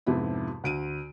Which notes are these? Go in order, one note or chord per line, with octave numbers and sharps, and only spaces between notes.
F2 G#2 C3 F3 B3 E4
D2 D7 D#7